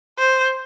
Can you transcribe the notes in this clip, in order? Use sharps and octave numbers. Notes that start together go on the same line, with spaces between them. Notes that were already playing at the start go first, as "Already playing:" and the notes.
C5